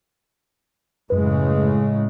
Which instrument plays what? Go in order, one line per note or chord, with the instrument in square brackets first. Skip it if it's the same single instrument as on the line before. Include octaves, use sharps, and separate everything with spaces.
[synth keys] F#2 B4 [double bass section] A2 C#3 G#3